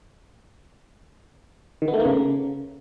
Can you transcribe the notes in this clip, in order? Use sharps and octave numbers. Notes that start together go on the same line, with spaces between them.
D#3
B3
A3
A#3
C#3